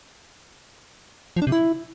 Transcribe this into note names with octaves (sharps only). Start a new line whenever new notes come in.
F3
D4
C3
E4